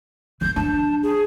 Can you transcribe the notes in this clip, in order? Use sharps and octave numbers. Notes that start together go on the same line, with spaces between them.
D#3 B3 G6
D4 A5
G#4